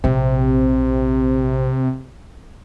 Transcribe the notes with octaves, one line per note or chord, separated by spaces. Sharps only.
A#1 C3 C4